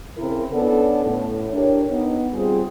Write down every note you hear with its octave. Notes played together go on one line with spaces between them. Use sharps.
C#3 C4 E4 A#4
B3 C#4 D4 A4 D5
A2
D4 G4 A#4 C#5
B3 D#4
G3 C4 F4 G#4